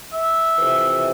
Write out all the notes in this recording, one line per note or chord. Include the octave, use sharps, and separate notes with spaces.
E5
F2 C3 E3